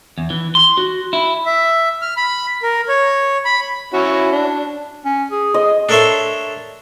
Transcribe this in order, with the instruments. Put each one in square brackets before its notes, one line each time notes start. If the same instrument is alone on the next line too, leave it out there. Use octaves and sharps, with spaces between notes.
[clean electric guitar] E2
E3
C6
F#4
E4
[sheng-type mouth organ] E5
F6
B5
A#4
C#5
B5
[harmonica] C#4 E4 F#4
D4
[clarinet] C#4
G#4
[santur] D#5
[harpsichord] D4 A4 A#4 C#5 E5 C6